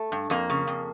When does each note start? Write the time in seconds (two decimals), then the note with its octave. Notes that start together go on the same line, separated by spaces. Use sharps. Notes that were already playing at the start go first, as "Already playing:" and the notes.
Already playing: A3
0.12 G2
0.30 F2 A#3
0.50 C#3
0.67 F2